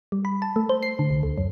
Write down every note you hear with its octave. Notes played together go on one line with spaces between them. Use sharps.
G3
B5
A5
A3
C5
C7
D3
C2
D2
F#2